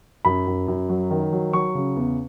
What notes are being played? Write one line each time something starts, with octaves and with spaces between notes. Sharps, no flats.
F#2 B5
F#2
F#2
F#3
D#3
F#3
F#3 C#6
C#3
E2